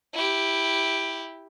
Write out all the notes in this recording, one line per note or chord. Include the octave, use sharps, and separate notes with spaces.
E4 G4